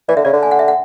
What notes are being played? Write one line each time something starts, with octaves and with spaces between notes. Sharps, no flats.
E3 D5
D3 E5
C#3 D5
D3
G#5
F#5
E5
F#5